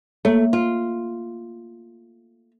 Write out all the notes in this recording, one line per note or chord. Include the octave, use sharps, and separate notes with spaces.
A3 A#3 C#5
F4